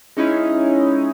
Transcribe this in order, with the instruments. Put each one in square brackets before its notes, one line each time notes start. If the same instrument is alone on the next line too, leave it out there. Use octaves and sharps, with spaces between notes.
[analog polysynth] G#3 C#4 D#4 E4